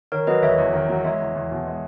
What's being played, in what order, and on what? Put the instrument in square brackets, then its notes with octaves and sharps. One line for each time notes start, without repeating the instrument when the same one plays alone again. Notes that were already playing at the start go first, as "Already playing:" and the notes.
[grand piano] D#3 [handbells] A#4 C#5
[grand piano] F#3 [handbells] B4 D#5
[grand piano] E1 [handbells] C#5 E5
[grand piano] E2
D#3
F#3
[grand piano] G#3 [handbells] C#5 E5
[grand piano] E2
E2
B2
G#3